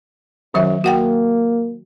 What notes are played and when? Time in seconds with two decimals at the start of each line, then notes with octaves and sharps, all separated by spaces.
0.54 F#2 D#3 F#3 E5
0.84 A#3 F#4 F#5 G5